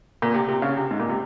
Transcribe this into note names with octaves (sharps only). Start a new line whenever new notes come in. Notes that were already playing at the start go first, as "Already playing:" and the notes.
A#2
C3
C3
C#3
C3
G#2
A#2
C3